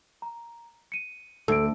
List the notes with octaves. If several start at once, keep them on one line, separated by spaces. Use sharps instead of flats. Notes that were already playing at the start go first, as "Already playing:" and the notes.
A#5
C#7 D#7
D2 A4 E6 D7